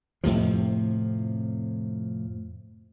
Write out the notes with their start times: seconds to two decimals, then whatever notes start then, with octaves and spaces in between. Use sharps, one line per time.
0.24 F2 A2 C3 F3